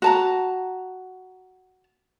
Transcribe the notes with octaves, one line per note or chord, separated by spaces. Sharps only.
F#4 A5 A#5